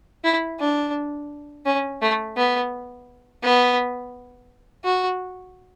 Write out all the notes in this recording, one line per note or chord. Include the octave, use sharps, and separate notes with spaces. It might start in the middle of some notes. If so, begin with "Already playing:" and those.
E4
D4
C#4
A3
B3
B3
F#4